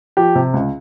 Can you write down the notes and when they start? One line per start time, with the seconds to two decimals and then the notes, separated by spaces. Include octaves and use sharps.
0.17 F3 G4
0.36 C3
0.54 C#2